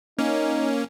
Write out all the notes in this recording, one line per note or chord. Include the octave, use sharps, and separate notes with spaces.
A#3 C#4 D#4